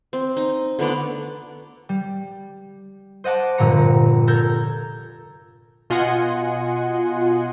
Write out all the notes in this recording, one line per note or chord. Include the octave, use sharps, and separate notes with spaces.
C4
D#4
D3 A3 B3 D5
G3
C5 D#5 F#5 A5 D6
F1 G2 A#2 D3 A#5 C#7
A4 A#4 A#5 G6 G#6
B2 F4 D#5 F#5 G#5 C6